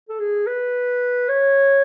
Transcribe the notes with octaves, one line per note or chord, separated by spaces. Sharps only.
A4
G#4
B4
C#5